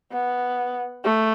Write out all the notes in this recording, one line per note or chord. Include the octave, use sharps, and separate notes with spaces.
B3
A3